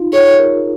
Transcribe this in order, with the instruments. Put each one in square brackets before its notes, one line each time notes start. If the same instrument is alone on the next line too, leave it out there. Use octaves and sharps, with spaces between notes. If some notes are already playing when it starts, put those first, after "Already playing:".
Already playing: [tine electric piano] D#4 F4
[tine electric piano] G#4 [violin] C#5
[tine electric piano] A#4